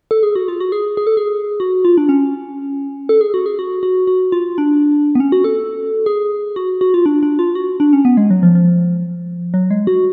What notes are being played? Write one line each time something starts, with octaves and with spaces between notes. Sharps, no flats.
A4
G#4
F#4
F4
F#4
G#4
G#4
A4
G#4
F#4
F4
D4
C#4
A4
G#4
F#4
G#4
F#4
F#4
F#4
F4
D4
B3
C#4
F#4
A4
G#4
F#4
F#4
F4
D4
D4
F4
F#4
D4
C#4
B3
G#3
F#3
F3
F3
F#3
G#3
F#4